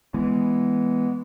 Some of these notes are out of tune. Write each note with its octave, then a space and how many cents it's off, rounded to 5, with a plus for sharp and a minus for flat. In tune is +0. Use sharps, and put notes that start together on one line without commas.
E3 +0 G#3 +0 B3 +0